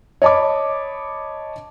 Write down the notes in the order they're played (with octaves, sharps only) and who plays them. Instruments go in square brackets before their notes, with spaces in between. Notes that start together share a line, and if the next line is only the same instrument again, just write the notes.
[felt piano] C#5 D#5 A5 B5 D6